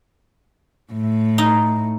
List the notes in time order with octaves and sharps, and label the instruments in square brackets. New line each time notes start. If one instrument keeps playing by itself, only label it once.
[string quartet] A2
[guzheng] D#4